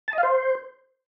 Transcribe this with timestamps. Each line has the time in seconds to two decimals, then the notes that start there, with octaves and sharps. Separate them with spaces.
0.08 A5
0.13 D#5
0.18 F5
0.23 C5